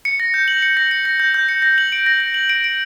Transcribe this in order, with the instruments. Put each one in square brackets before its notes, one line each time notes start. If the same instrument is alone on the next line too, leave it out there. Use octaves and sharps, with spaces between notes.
[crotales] C#7
A#6
G6
F#7
C#7
A#6
C#7
A#6
G6
G6
C#7
A#6
F#7
D7
A#6
A#6
F#7
D7
D7